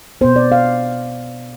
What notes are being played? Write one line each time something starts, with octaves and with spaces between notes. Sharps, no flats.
B2 B3 C5
D5
F5